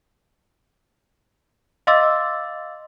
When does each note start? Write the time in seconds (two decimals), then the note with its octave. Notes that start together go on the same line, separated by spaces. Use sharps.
1.87 D#5 F5 C6 D6 E6 A6